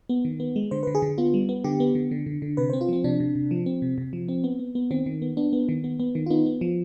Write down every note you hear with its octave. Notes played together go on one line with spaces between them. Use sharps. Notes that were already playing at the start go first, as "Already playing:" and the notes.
B3
D#3
B3
G#3
D3 C5
B4
D3
G#4
D3
B3 F4
G3
B3
D3 G4
B3
D3
D3
D3
D3
C3 B4
C5
C4
F4
F3 C4
C3 D4
C3
C3
F3
C4
C3
C3
F3
C4
B3
B3
B3
D#3 C4
D#3
B3
B3 D4
B3
D#3
B3
B3
D#3
F4
B3 D#4
B3
F3